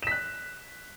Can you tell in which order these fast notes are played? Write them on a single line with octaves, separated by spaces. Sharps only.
E7 B6 F#6